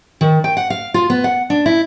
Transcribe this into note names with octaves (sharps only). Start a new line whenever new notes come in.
D#3
G5
F#5
F5
F4
B3
F#5
D4
E4